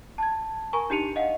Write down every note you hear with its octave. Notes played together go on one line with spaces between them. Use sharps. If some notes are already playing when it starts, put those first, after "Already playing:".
A5 G#6
A#4 G#5 A#5 C#6
D4 D#4 G4 C#7 D#7 F7
D#5 F5 F#5